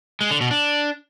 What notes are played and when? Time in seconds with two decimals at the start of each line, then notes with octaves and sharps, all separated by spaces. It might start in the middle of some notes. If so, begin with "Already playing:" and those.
0.21 G#3
0.31 D3
0.41 B2
0.51 D4